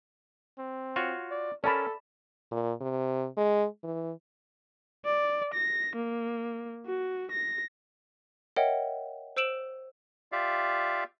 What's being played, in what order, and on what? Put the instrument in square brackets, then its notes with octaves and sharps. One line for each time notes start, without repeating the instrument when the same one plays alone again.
[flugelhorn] C4
[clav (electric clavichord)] F4 F#4 C#5
[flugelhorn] D5
[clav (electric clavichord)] C#4 A#4 [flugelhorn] A4 [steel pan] D5 A5 B5
[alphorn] A#2
C3
G#3
E3
[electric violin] D5
A#6
A#3
F#4
A#6
[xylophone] A#4 C#5 D#5 E5 F#5 G5
C5 E6 D7 E7 F#7
[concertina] F4 G4 D5 E5 F5